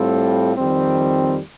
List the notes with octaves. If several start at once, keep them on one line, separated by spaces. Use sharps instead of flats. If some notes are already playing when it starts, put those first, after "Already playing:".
Already playing: A2 G3 C4 F4 A4
F2 D#3 G3 C4